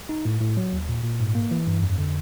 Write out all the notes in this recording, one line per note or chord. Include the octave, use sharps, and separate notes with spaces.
D#4
A2
A2
F#3
D#2
A#2
A#2
G#2
A#3
E3
G2
F2
D3